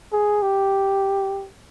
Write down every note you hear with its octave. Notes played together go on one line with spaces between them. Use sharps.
G#4
G4